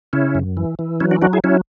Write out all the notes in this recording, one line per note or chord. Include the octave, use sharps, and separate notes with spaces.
C#3 C#4 E4
F#2
E3
E3
F#3 C#4 E4
D4 F#4
F#3 D4 F#4
E4 G#4
F#3 C#4 E4